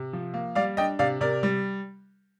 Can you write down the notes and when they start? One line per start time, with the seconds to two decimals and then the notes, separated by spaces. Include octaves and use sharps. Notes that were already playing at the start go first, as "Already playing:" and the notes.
Already playing: C3
0.13 F3
0.34 A#3
0.55 G3 D5 F5
0.77 D4 D#5 G5
0.99 C3 D5 F5
1.20 C3 A#4 D5
1.43 G3